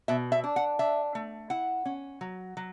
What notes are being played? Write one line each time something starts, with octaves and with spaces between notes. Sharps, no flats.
B2 E5
E5
D4
F#5
D4 E5
A3
E4 F#5
C#4
F#3
F#3